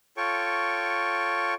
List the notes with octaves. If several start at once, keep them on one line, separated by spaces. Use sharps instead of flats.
F4 A4 C#5 G5 C#6